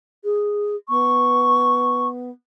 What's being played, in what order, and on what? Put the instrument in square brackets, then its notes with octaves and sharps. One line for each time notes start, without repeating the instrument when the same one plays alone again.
[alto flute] G#4
[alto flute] B3 [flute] C#6